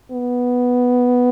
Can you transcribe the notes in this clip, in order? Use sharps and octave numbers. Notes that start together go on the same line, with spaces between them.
B3